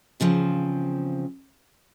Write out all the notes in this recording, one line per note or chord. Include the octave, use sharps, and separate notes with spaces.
E2 C#3 F3 C4